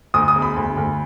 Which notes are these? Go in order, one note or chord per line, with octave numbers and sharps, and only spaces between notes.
D2 D#6
D#6
E1
B5
D2
D2